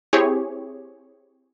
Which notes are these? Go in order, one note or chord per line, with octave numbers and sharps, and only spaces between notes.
C4 E4 G4 G#4 C#5